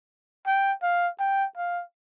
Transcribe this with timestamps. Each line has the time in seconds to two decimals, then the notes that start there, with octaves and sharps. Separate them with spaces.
0.47 G5
0.83 F5
1.20 G5
1.57 F5